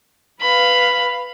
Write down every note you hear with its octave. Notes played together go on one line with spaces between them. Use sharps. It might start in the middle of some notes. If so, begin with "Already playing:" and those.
B4 F5 B5